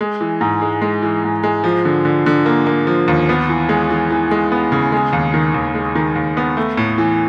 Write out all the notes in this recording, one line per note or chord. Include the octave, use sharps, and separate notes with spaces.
G#3
E3
G#2
G#3
G#3
E3
G#2
G#3
F3
D3
D3
D3
A#3
A#3
F3
D#2
B3
E3
G#3
E3
E3
G#3
B3
C#3
G#3
D#2
D#3
D#2
G#3
D#3
D#2
B3
A3
A2
E3